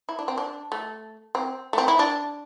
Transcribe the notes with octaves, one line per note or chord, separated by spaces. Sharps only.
E4
D4
C4
D4
A3
C4
A3
C4
E4
D4